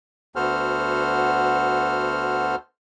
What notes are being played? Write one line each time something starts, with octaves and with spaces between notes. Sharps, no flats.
D2 B3 F#4 A4 C5 F6